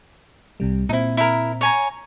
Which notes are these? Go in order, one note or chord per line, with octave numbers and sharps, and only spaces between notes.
C2 C3 G3
A#2 C4 D#4 E4
E4 A#4
C#5 G#5 A#5